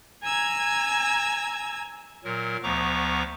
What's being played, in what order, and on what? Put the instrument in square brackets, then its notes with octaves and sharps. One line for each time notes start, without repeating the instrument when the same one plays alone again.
[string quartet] G#5 A#5 E6 G#6
[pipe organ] A#2 F#3 A#4
D2 F3 B3 A#5 C#6 D6